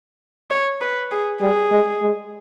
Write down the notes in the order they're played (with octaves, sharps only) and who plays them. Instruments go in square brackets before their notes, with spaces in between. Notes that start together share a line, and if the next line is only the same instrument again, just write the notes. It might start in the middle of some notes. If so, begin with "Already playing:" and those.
[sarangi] C#5
B4
G#4
[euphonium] G3 [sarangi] G#4
[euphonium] G#3
G#3